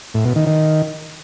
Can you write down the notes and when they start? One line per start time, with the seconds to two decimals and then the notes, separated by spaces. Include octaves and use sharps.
0.14 A2
0.25 B2
0.36 D#3
0.47 D#3